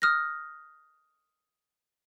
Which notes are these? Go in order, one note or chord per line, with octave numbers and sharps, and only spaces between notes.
D#6 F6 F#6 A#6